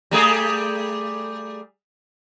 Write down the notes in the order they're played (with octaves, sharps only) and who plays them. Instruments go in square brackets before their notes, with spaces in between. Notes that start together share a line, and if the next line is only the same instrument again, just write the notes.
[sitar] G3 A3 G#4